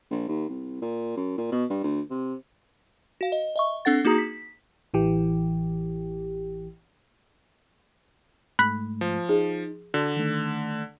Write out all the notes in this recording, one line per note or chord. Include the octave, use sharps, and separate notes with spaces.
A#1
D#2
C2
A#2
F#2
A#2
B2
G2
D2
C3
F#4 F5
D#5
D#5 E5 C#6
C4 D4 A4 F#5 A6
A#3 D#4 F#4 G#4 A#5 D#6
B6
A1 E3 G4
G#2 A3 B5 F#6 B6
F3
D#4 G#4
D3 F#4
D#3 A3